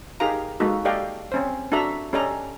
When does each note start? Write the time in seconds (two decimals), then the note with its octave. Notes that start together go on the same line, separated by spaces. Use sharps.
0.20 D#4 G4 G#4 A#4 F5 A#5
0.60 G#3 A#3 D#4 F#4 A4
0.85 G4 A4 D5 D#5 F5 G5
1.32 C4 C#4 C5
1.72 D4 F#4 A4 E5 A#5
2.13 C#4 G4 A4 D5 D#5 A#5